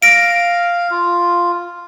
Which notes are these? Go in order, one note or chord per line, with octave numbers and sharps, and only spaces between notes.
F5 A#6 D7
F4